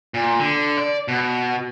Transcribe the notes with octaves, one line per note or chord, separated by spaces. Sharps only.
A#2
D3
D5
B2